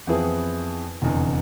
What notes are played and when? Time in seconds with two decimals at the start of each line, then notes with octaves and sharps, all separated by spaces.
0.07 F2 E3 B3 E4 G#4
1.02 F1 E2 D3